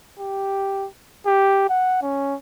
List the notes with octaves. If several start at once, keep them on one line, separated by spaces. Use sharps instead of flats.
G4
G4
F#5
C#4